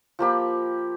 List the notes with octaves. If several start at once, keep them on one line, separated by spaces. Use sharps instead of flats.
F3 A#3 G4 B5